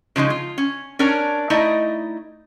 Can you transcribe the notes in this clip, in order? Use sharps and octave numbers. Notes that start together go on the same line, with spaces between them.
C#3 F3 G#3 D#4
F4
C#4
C#4 D4 A#4 C#5
A3 D#4 E4 D5 D#5